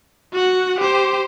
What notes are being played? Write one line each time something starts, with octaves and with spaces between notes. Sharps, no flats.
F#4 F#5
G4 C5